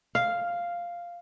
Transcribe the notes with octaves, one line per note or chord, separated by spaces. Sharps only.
F5